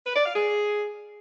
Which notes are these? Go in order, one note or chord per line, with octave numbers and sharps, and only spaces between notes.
B4
D5
F5
G#4